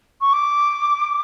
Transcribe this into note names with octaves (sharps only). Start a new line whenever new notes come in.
C#6
D6